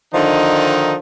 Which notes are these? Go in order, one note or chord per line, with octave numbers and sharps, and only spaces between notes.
D3 D#3 F3 D#4